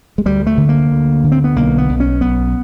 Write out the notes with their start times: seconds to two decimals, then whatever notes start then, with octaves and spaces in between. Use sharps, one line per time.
0.18 G#3
0.25 D2 G3
0.47 A3
0.57 D3
0.69 A#3
0.91 D2
1.24 D3
1.32 C4
1.44 B3
1.56 B1 A#3
1.78 B3
1.89 B1
2.00 C#4
2.21 B1 B3